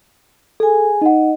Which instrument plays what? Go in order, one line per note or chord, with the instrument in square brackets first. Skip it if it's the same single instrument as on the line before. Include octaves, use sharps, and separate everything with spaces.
[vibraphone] G#4 G#5 [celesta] A4
[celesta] D#4 F#5 [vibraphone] D#5